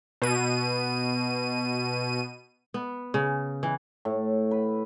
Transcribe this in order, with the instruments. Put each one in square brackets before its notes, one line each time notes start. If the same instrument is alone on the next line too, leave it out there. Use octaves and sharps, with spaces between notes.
[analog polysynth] B2 D#7
[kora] B3
C#3
E3
[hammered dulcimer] A2
B4